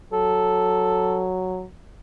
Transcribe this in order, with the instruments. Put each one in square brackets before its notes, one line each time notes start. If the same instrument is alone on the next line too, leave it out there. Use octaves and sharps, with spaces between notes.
[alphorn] F#3 [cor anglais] A4